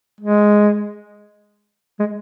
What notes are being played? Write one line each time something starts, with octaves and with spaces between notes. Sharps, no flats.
G#3
G#3